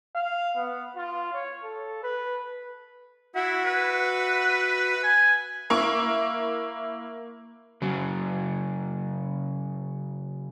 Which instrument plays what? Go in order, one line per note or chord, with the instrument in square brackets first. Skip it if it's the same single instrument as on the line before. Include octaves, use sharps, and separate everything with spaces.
[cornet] F5
B3
F4
C#5
A4
B4
[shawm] E4 [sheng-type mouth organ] F#4 E5 F#5
[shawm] B4
G#5
[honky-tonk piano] A#3 E4 C#6
[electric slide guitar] C#3 F#3